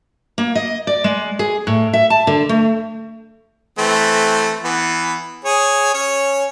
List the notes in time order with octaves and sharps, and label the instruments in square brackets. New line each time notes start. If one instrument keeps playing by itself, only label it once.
[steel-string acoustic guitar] A#3
D#5
D5
G#3
G#4
A2
E5
A5
D3
A3
[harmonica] E3 A3 C4
E3 B3
G#4 C#5 G#5
C#4 C#5